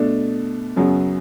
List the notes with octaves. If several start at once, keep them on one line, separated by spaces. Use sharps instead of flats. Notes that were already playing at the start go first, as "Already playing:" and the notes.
Already playing: B2 A3 D4
F#2 C#3 F#3 B3